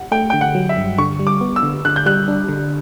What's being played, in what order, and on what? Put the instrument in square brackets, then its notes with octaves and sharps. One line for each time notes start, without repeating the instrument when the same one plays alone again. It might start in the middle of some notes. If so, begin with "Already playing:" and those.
Already playing: [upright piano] F#5
[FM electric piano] A3 [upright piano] G5
[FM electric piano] D3 [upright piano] G5
[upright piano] F#5
[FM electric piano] F#3
[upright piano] E5
[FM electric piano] G2
[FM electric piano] D3 [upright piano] C#6
[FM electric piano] G3
[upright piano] D6
[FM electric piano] B3
[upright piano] E6
[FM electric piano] D3
[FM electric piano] D3 [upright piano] F#6
[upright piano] G6
[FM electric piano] G3 [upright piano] F#6
[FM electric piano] D4
D3